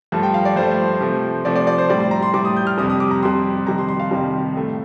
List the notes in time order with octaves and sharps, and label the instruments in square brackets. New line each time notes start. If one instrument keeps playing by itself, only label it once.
[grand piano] G2 F3 A3 A5
G5
F5
D5
G2 F3 A3 C5
C3 F3 A3
C3 F3 A3 D5
D5
D5
C5
A2 G3 D5
C6
A#5
C6
A2 G3 D6
D#6
G6
F6
F2 C3 G3 D#6
D#6
D6
A#5
F2 C3 G3 C6
F2 C3 D#3 G3 A#5
C6
C6
F5
F2 C3 D#3 G3
A2 A3